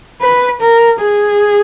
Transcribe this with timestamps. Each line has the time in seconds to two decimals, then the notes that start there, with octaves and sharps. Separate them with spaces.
0.21 B4
0.61 A#4
1.00 G#4